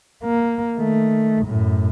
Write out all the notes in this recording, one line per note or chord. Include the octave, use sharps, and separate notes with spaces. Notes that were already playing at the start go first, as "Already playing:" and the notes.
A#3
D#3 A3
F#2 A2